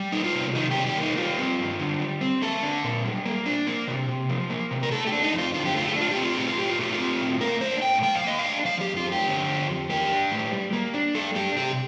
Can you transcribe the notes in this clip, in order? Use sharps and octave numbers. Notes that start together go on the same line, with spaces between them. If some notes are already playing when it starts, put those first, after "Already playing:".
Already playing: G3
A#3 D#4
F4
C3
D#3 D#4
G3 G4
G4
A#3
D#4
G3 F4
C4
G2
D3
G3
C4
A#3 A4
D4
A#2
G3
A#3
D4
A#3
C3
C3
F3
A#3
C3
A#4
A3 A4
G4
D4
D#4
F2 F4
D3 F4
G4
A3 F4
G4
D4
F4
G4
C4
F4
A2 G4
F4
A2 G4
F4
A3 G4
F4
C4
A2
A#3 A#4
D4 C5
A2 G5
F3 G5
F5
A#3 D#5
F5
D4
F3 F5
G4
F2
F4
F2
G4
D3
F3
F2
A#3 G4
D4
A2
G3
A#3
D4
G3 A4
D4 G4
C3 G4